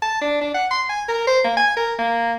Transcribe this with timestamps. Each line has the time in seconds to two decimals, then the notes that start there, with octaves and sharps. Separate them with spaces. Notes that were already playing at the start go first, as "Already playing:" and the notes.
0.02 A5
0.21 D4
0.41 D4
0.54 F#5
0.71 C6
0.89 G#5
1.08 A#4
1.27 C5
1.44 A#3
1.56 G#5
1.76 A#4
1.99 A#3